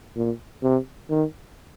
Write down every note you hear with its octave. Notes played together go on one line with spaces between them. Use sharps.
A#2
C3
D#3